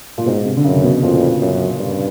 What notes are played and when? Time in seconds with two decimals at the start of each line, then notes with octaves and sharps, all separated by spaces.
0.18 A#2
0.26 G#2 B2
0.45 C3
0.57 D3
0.64 F#2 C#3
0.83 B2
1.02 F2 A#2
1.42 F#2
1.80 G2